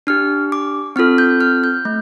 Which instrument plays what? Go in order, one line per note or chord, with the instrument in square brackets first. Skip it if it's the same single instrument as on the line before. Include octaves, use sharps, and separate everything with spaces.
[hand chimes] D4 G4 F6
D6
C4 F4 A4 F6
G6
F6
G6
A3